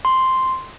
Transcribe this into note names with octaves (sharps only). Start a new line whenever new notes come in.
C6